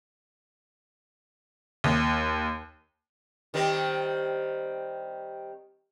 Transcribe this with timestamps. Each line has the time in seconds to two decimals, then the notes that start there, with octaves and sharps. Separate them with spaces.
1.84 D#2
3.54 D#3 G3 C4